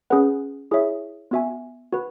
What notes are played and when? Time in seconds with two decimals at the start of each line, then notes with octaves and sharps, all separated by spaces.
0.10 C#4 G#4 B4 F#5
0.71 E4 G#4 C#5 E5
1.31 B3 F#4 E5 G#5
1.93 F#4 B4